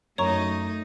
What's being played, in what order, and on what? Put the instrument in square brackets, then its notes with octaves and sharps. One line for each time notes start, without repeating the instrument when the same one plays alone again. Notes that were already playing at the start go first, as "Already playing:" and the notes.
[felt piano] F#2 [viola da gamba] A3 D#4 [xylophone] C#5 A#5 C#6